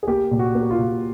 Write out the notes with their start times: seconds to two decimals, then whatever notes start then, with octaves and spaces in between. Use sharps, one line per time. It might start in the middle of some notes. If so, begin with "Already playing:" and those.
0.03 G#4
0.08 A#3 G4
0.31 A#2
0.39 F#4
0.55 A#3
0.63 F#4
0.70 F4
0.78 A#2